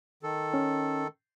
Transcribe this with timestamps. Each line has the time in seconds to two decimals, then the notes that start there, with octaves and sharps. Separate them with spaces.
0.23 D#3 A4
0.54 C#4